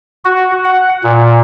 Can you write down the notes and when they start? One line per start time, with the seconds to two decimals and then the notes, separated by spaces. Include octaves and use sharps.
0.25 F#4
0.64 F#5
1.03 A#2